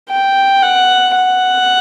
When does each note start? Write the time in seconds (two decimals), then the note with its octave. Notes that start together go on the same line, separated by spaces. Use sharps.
0.10 G5
0.63 F#5
1.16 F#5